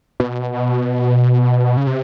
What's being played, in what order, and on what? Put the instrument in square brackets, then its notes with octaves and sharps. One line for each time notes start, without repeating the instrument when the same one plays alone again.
[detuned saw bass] B2
C#3
C3